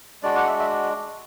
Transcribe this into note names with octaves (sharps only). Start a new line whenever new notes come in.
G#3 D4 F#4 D5
F#5
E5
E5